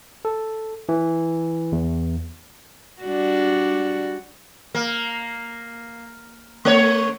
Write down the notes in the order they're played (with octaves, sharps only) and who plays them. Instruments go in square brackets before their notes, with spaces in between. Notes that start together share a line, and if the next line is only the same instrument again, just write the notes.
[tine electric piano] A4
E3
E2
[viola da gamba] G3 D4 F#4
[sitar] A#3
A3 C#5